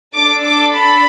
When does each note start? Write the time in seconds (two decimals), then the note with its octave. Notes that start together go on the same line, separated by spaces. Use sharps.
0.14 D4 A4 D6
0.44 D6
0.75 B5